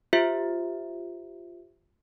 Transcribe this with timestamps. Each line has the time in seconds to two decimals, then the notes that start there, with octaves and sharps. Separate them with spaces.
0.13 F4 G4 C5 E5